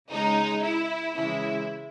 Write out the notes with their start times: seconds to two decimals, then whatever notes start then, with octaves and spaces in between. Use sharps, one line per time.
0.10 C#3 G#3 D#4
0.63 E4
1.16 C#3 E3 G#3 E4